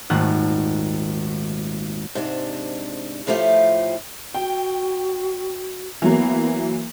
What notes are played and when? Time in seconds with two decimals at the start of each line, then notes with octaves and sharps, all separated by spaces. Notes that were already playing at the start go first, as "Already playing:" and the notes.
0.10 D#1 G#1 G#3 A3 F#5 A6
2.15 G#2 C3 D4
3.27 A2 F3 A3 F4 G4
4.34 F#4 G5
6.02 E3 F#3 A#3 B3